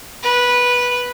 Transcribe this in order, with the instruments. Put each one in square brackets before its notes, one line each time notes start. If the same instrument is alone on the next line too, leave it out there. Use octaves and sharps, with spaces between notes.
[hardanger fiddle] B4